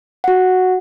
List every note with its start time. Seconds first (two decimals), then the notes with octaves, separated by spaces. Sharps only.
0.24 F#4 F#5